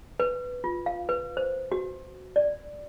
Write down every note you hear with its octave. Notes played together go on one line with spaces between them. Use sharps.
B4
F4
F5
B4
C5
F#4
D5